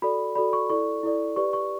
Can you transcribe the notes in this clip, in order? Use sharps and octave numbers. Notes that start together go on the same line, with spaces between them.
F#4 A4 D5 B5
F#4 A4 D5 B5
C#6
E4 A4 D5 C#6
E4 A4 D5
G4 B4 D5 C#6
C#6